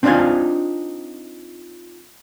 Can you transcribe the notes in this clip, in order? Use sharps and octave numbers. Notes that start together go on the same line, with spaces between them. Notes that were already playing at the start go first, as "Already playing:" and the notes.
C4 D4 D#4 F4 F5 G#5